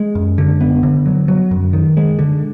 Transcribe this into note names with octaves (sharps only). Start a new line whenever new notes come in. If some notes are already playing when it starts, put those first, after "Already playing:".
Already playing: G#3
F#2
D3
B3
D3
F#3
F#3
F#2
D#3
G#3
D3